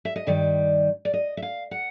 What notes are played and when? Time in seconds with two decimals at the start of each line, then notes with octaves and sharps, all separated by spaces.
0.05 E5
0.16 D#5
0.27 G2 D#3 G3 D5
1.05 D5
1.14 D#5
1.37 E5
1.42 F5
1.71 F#5